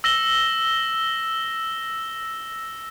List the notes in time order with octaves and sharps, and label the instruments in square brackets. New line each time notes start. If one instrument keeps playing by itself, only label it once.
[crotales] E6 A#6 E7 G7